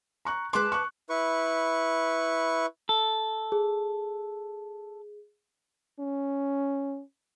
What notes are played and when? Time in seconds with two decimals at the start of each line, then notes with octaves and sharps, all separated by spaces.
0.25 A#5 C#6 F#6
0.53 G#3 B4 A5 C6 D6
0.72 C#6 F#6
1.09 E4 B4 C#6
2.89 A4
3.52 G#4
5.99 C#4